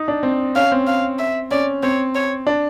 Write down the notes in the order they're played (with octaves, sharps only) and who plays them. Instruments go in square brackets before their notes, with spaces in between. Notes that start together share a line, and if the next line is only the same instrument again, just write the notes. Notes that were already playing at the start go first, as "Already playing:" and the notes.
Already playing: [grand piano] D#4
D4
C4
[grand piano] C#4 [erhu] F5
[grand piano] C4
[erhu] F5
E5
[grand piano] C#4 [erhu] D5
[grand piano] C4 [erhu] C#5
[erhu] C#5
[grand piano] D4